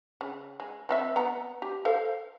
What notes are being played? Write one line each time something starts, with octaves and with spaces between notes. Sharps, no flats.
C#3
G#3
F3 C4 E5
B3 F#5 A#5
G4
A4 C5 F5